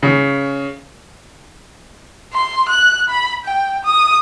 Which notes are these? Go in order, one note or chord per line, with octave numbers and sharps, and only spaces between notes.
C#3
C6
F#6
B5
G5
D#6